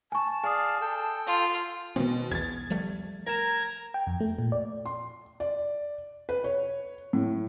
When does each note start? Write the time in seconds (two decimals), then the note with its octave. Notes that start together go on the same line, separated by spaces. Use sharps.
0.12 G#5 A5 C#6
0.44 G#4 D5 F5 G#5 D#6
0.81 A4 G5
1.27 F4
1.96 B2 D#3 G#3 C4
2.31 B1 E2 G#6 A6
2.70 F3 G3 A3
3.27 A#4 A#5 G#6 E7
3.94 G5
4.07 F2
4.20 A3
4.39 A#2
4.52 D5
4.85 C6
5.40 D5
6.29 B4
6.44 C#5
7.13 A2